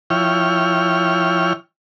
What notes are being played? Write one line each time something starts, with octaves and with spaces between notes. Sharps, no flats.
F3 E4 C#5 G5 F6